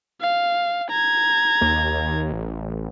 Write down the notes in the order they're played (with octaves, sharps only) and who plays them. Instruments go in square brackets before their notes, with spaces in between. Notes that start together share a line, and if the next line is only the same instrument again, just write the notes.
[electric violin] F5
A#5 G#6
[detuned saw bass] D#2
A1